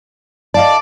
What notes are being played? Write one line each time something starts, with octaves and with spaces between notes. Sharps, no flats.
D5 D#5 F5 A5